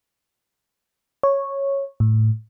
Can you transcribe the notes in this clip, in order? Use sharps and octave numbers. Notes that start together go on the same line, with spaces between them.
C#5
A2